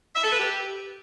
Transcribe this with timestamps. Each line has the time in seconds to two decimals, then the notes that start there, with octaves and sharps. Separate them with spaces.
0.15 E5
0.23 A4
0.31 B4
0.39 G4